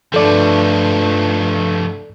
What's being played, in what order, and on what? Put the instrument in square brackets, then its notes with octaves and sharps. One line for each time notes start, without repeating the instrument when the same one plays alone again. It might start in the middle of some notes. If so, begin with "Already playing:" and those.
[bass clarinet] G2 [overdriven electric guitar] F3 A3 [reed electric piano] A4 D5